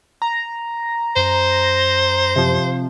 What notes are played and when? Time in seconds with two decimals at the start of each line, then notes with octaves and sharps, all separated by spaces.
0.22 A#5
1.16 F#2 C5
2.36 C3 F3